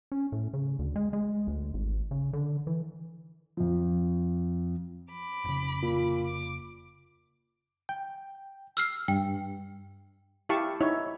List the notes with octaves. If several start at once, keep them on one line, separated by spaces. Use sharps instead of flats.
C#4
A2
C#3
D2
G#3
G#3
D2
G#1
C#3
D3
E3
F2 F3
B5 D6
F1 C#3
A#2
D6
G5
E6 F6 C7
G2 G5
E4 G4 F5 A5 C#6
D#4 E4 C#5